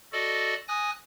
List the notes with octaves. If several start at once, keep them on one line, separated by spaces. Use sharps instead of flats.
F#4 A4 D5 D#5
G#5 D#6 F#6 A#6